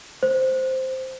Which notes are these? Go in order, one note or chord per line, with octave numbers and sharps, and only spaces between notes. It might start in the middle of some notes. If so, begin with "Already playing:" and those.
C5